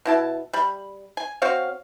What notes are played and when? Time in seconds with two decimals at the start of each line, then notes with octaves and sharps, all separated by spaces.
0.05 B2 E4 A5
0.53 G3 B5
1.17 G#5
1.42 C4 F#4 C#5 F5